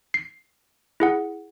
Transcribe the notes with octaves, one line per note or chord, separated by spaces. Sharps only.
C7
E4 G#4 F#5